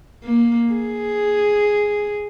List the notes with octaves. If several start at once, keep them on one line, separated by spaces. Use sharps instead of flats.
A#3
G#4